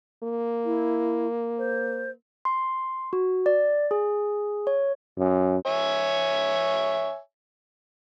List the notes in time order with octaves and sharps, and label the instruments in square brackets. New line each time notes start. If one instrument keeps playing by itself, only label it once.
[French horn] A#3
[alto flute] E4
C5
[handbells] C6
F#4
D5
G#4
C#5
[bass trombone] F#2
[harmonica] C#5 E5 G#5